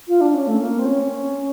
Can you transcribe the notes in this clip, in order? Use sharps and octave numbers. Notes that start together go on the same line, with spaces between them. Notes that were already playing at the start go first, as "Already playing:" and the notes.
F4
D4
C#4
A3
A#3
C4
C#4